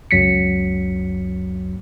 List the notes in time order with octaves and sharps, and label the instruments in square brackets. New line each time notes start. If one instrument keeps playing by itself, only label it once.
[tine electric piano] C#2 F#2 F#3 B6 C#7